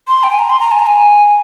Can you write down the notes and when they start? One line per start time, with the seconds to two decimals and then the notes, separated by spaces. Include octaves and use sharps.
0.08 C6
0.23 G5
0.30 G#5
0.39 A#5
0.50 C6
0.60 A#5
0.71 G#5
0.79 A#5
0.86 G#5